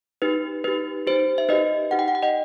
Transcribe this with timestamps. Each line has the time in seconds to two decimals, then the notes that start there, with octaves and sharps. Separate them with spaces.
0.22 D#4 G4 B4
0.64 D#4 G4 B4
1.07 D#4 G4 C5
1.38 E5
1.49 D#4 G4 B4 D#5
1.91 D#4 G4 F#5
1.99 G5
2.08 F#5
2.15 G5
2.22 D#5 F#5